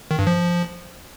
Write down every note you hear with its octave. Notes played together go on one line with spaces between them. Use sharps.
D#3
G2
F3